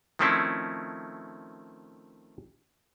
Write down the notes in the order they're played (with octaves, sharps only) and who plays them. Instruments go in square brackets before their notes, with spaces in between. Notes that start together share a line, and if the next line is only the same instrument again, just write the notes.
[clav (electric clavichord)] D#3 F3 A3 C4 C#4 E4